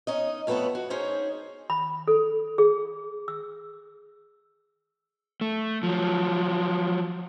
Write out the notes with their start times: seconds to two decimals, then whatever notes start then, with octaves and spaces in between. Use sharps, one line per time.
0.07 C#4 D#4 D#5
0.47 F2 A3 B3 B4 C#5 A5
0.75 F#4
0.90 C#4 D#4 G#4 C5 C#5
1.70 B5
2.07 A4
2.58 G#4
3.28 E6
5.41 A3
5.83 F3 F#3